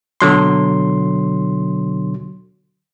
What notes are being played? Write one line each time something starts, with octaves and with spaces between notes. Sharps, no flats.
B2 D3 F#3 C6